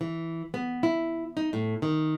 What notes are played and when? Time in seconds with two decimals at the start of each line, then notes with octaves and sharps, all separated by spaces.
0.01 E3
0.54 B3
0.83 E4
1.37 D#4
1.53 A2
1.82 D#3